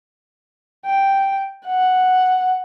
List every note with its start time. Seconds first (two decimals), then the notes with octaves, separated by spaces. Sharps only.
0.86 G5
1.66 F#5